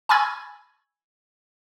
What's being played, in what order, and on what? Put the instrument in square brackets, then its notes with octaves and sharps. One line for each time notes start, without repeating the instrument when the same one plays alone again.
[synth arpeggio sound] G#5 B5 C#6 E6 G#6